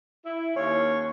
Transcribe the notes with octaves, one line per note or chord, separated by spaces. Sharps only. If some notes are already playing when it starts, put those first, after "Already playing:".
E4
D#2 C#4 F4 C#5